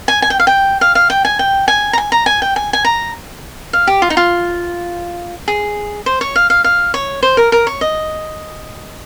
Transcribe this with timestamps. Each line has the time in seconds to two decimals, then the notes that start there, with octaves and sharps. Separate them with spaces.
0.08 G#5
0.22 G#5
0.30 G5
0.40 F5
0.47 G5
0.81 F5
0.95 F5
1.10 G5
1.25 G#5
1.39 G5
1.68 G#5
1.93 A#5
1.98 G#5
2.12 A#5
2.26 G#5
2.42 G5
2.56 G#5
2.73 G#5
2.85 A#5
3.73 F5
3.87 G4
4.02 F4
4.10 D#4
4.17 F4
5.48 G#4
6.06 C5
6.21 C#5
6.36 F5
6.50 F5
6.64 F5
6.94 C#5
7.23 C5
7.37 A#4
7.52 A#4
7.67 C#5
7.81 D#5